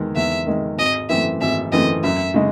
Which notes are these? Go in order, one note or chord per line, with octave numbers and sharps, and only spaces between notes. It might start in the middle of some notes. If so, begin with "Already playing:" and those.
Already playing: E2 D#3 G#3
E2 E5
D#3 G#3
G#1 D#5
F#2 E3 A3 C4 E5
G#1 E5
F#2 E3 A3 C4 D#5
F#2 E5
C#3 G#3 D#4